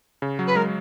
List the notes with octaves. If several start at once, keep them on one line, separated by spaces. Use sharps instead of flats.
C#3
F#3
B4
G#3 A#4